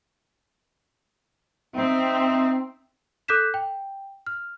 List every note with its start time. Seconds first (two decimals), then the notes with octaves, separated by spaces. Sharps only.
1.76 C4 D#4 E5
3.28 A4 D6 F#6 G6 B6 E7
3.54 G5
4.27 F6